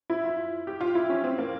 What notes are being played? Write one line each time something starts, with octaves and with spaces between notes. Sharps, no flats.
E4
F4
G4
F4
E4
C#4
C4
A#3